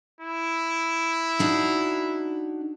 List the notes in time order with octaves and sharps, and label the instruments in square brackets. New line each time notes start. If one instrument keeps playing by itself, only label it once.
[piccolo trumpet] E4
[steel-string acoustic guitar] D4 D#4 F#4